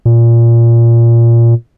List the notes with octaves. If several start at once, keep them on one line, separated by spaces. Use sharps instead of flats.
A#2